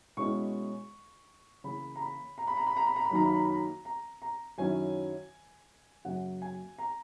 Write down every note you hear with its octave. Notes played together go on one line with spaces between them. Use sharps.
B2 G#3 C#4 E4 C#6
C#3 E3 A#3 B5
A#5
B5
A#5
B5
A#5
B5
A#5
B5
A#5
B5
F#2 D#3 F#3 A#3 D#4 A#5
B5
A#5
B5
A#5
A#5
A#5
F#2 D#3 F#3 C#4 E4 G#5
F#2 C#3 F#3 A#3 F#5
G#5
A#5